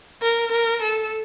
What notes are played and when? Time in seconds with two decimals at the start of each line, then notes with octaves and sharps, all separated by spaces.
0.22 A#4
0.52 A#4
0.82 A4